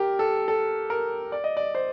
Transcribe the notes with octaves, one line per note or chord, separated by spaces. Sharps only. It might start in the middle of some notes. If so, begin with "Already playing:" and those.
Already playing: G4 A#4
A4
A4
A#4
D5
D#5
D5
C5